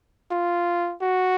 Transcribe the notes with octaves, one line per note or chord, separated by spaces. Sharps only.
F4
F#4